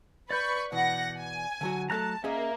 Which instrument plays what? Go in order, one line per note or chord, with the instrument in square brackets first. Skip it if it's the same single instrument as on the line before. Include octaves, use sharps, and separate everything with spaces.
[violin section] B4 B5 C#6 [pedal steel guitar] D5 G6
[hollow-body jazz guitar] B2 E3 [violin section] F#5 A#6
[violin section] G#5
[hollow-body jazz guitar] D3 F#3 F#4
[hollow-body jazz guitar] F#3 A3 A4 [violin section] A5 [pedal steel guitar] A#5 F#6
[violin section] A#3 [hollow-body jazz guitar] C#4 G#4 D#5 [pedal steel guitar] E5